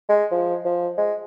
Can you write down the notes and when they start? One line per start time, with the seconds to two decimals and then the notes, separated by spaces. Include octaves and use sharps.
0.09 G#3
0.32 F3
0.65 F3
0.98 G#3